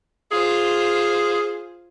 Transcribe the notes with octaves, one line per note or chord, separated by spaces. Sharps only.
F4 G#4 C5